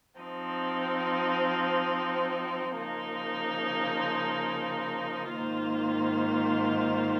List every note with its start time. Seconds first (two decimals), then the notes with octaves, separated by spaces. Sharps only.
0.19 F3 C4 D#4
2.76 C#3 F3 A#3 D#4
5.34 G#2 D#3 A#3 F4 C5